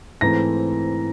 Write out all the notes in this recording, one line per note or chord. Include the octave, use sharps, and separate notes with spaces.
G#2 E3 A3 C4 A#5 A#6